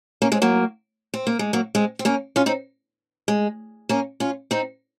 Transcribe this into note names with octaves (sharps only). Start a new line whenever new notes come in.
A#3 C#4
G#3 C4
F#3 A#3
C4
A#3
G#3
F#3 A#3
G#3 C4
C4
A#3 C#4
C#4 F4
C4 D#4
G#3
A#3 C#4
C#4 F4
C4 D#4